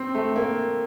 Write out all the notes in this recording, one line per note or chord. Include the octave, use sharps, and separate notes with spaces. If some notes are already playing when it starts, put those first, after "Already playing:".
Already playing: C4
A3
A#3